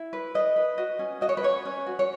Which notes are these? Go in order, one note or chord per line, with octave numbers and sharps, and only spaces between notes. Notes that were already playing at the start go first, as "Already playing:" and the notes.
Already playing: E4
B4
B4 D#5
B4
F#4 D#5
C#4
F#4 D#5
C#5
B4
C#4 C#5
C#4
F#4
C#5